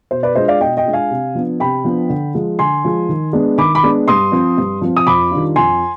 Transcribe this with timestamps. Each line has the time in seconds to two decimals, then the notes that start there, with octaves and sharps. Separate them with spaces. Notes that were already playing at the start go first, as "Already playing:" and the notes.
0.11 B2 C5
0.23 B4 D5
0.35 G#3 D4 F4 C5 D#5
0.48 D5 F5
0.60 B2 D#5 G5
0.77 D#5 G5
0.85 G#3 D4 F4
0.93 F5 G#5
1.10 C3
1.35 F3 B3 D4
1.60 C3 G5 B5
1.84 F3 B3 D4
2.09 D3
2.35 F3 G#3
2.59 D3 G#5 C6
2.84 F3 G#3
3.09 D#3
3.33 G#3 B3 D4
3.58 D#3 B5 D6
3.75 B5 D6
3.83 G#3 B3 D4
4.08 G2 C6 D#6
4.32 F3 C4
4.58 G2
4.81 F3 C4
4.97 D#6
5.07 F2 B5 D6
5.31 D#3 G3 D4 F4
5.56 F2 G#5 C6